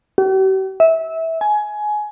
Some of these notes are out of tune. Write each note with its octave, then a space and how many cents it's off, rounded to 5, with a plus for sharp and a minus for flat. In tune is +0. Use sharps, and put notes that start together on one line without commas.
G4 -45
E5 -20
G#5 +20